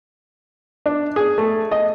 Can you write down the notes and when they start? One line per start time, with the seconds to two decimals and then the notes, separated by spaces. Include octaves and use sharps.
0.86 D4
1.16 G#4
1.38 A3
1.71 D#5